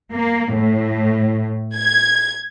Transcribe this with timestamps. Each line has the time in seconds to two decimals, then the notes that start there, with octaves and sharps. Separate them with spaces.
0.12 A#3
0.53 A2
1.76 G#6